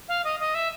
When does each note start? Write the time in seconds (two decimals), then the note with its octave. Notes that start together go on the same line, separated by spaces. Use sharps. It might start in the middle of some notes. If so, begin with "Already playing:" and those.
0.08 F5
0.24 D#5
0.40 D#5
0.55 E5